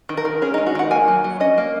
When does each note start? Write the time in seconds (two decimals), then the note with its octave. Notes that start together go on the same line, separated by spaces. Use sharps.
0.09 D#3
0.17 A#4
0.25 D#3
0.42 C#4 G#4
0.54 G#3 D#4
0.66 F#4
0.75 D#3 F#5
0.91 A#3 G#5
1.08 F#3
1.24 F#3
1.40 C#4 D#5
1.58 A#3